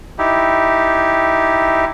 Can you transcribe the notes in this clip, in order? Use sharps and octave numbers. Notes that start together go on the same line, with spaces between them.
D#4 E4 G4